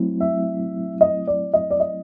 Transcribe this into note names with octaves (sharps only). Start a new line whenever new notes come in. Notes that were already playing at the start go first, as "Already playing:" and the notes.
Already playing: F#3 A3 C4 E4
E5
D#5
D5
D#5
D5
D#5